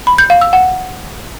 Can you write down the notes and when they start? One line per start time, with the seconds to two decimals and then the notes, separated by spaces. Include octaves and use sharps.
0.07 B5
0.18 G6
0.30 F5
0.41 E6
0.53 F#5